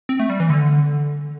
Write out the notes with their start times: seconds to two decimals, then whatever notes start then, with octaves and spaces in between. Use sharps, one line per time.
0.09 C4
0.19 A3
0.30 G3
0.40 E3
0.50 D3